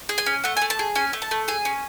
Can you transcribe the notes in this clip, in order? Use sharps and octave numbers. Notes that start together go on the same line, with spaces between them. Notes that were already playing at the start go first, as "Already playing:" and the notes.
G#4
G#5
C#4
A3 F#5
G#5
A3
A5
G#4
C#4 G#5
A3
A5
A3
G#4 G#5
C#4